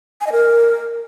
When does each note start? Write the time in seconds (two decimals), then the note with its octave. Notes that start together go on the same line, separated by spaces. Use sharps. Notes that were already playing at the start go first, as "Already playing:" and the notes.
0.21 G#5
0.27 D#5
0.32 A#4